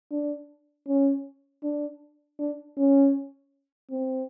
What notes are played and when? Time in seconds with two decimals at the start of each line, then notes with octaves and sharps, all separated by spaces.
0.11 D4
0.87 C#4
1.63 D4
2.39 D4
2.77 C#4
3.91 C4